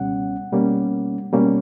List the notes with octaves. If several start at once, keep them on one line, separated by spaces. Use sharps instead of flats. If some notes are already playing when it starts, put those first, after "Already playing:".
Already playing: C#2 B2 G3 C#4 F#5
B2 G3 A#3 C#4
B2 G3 A#3 C#4